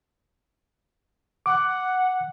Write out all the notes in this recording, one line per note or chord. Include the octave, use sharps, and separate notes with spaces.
F#5 D6